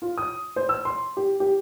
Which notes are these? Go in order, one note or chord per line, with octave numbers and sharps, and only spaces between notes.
F4
D#6
C5
E6
C6
G4
G4